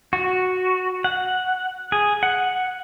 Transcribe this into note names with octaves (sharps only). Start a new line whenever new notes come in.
F#4
F#5
G#4
F#5